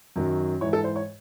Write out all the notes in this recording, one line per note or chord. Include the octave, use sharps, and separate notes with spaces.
F#2 D#3 F#3
G#2 E3 C#5
A4
C5
C#5